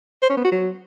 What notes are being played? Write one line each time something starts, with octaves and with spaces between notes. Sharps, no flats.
C5
C#4
B3
F#4
F#3